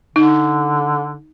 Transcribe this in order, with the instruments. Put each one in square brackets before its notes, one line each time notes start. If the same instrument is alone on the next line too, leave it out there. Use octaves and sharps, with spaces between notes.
[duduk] D3 [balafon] D#4